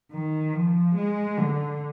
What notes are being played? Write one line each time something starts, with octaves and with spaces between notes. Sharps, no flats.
D#3
F3
G#3
D3